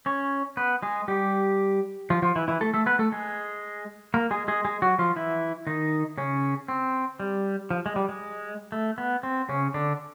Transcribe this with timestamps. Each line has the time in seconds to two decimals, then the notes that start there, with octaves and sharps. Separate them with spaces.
0.06 C#4 C#5
0.57 B3 B4
0.82 G#3 G#4
1.08 G3 G4
2.10 F3 F4
2.22 F3 F4
2.36 E3 E4
2.48 E3 E4
2.61 A3 A4
2.74 A3 A4
2.86 B3 B4
2.99 A3 A4
3.12 G#3 G#4
4.14 A#3 A#4
4.31 G#3 G#4
4.48 G#3 G#4
4.65 G#3 G#4
4.82 F#3 F#4
4.99 F3 F4
5.16 E3 E4
5.67 D#3 D#4
6.18 C#3 C#4
6.68 C4
7.20 G3
7.71 F3
7.86 G#3
7.96 G3
8.09 G#3
8.72 A3
8.98 B3
9.23 C4
9.49 C#3 C#4
9.74 D3 D4